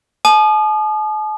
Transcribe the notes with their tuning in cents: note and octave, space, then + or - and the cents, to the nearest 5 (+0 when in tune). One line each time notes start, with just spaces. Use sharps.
A5 -45 D#6 -35